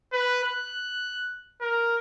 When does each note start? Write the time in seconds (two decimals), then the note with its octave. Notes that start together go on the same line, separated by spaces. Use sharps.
0.13 B4
0.44 F#6
1.61 A#4